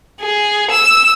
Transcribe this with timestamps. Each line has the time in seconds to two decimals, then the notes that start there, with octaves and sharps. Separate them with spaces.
0.21 G#4
0.71 E6